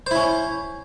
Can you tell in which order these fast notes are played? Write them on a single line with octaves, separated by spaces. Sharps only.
C5 E4 C#4